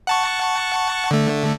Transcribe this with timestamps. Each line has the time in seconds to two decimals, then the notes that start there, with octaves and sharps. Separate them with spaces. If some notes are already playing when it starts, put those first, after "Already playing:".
0.07 F#5 A5 C#6
1.11 D3 A3